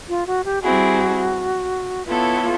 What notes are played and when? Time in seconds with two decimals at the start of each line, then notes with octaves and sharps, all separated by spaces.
0.09 F4
0.27 F#4
0.45 G4
0.62 G3 C4 E4 F#4 G#4
2.06 B3 E4 F4 A4 C#5
2.42 F4